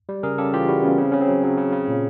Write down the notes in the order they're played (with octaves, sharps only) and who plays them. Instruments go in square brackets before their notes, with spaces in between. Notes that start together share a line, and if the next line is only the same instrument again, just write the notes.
[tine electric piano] G3
C#3 G#4 A#4
C#3 G4 A4
E3 F4 G4
G3 E4 F#4
C#3 B3 C#4
C#3 C4
C#3 C#4
C4
F#3
F#3
C#3
C#3
A#2